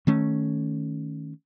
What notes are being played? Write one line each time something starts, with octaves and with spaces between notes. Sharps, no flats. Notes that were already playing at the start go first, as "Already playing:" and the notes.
D#3 A3 C#4